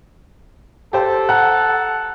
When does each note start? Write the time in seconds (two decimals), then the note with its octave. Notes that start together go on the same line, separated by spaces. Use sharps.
0.93 G4 A4 C5
1.29 F#5 A#5 F#6